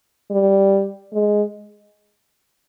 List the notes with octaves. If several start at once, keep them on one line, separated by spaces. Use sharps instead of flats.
G3
G#3